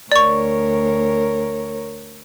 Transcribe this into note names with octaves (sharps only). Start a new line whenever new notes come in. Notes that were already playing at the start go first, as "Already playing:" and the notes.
D2 A#4 C#5 D5 C#6